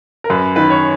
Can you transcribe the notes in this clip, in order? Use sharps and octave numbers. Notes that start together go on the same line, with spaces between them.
A#4
F#2 B4
D#3 B4
C#5